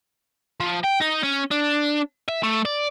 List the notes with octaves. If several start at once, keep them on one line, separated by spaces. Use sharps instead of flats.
F3
G5
D#4
C#4
D4
E5
A3
D5